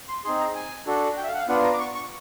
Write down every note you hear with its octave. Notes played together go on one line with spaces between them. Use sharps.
C6
C4 D#4 G#4 C6
A#5
G#5
D4 F#4 A4
G5
E5
F5
F#5
F5
B3 D4 F4 F#5
A#5
D6
C#6
C#6